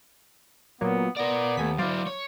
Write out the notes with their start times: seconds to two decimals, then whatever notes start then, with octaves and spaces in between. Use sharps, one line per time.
0.81 A#2 F#3 A#3 B3
1.17 B3 A#4 D5 A#6
1.57 D#2 A3 G#5 B6
1.78 F#3 E4 C5 D5 F5
2.06 C#5